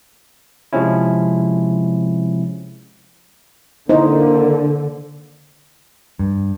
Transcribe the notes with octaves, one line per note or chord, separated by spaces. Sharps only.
C3 F3 G#3 C4 C#4 E4
D3 A#3 D#4 E4 C5
G2